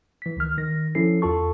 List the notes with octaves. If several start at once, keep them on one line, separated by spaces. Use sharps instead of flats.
E3 B6
C#2 D#3 F6
D#3 A#6
F3 C#4 E4 A4 C7
E2 F4 A4 A5 C#6